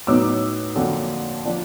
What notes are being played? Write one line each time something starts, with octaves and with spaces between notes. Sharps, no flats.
A2 F#3 B3 D#4 D6 E6
F2 D3 F#3 A#3
F3 A#3 D4 F4